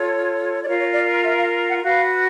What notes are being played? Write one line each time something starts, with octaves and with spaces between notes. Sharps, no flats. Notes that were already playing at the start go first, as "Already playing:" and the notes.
Already playing: F4 A4 C#5
F4 A#4 C#5 D5
C#5
D5
E5
F5
F#5
F#4 B4 F5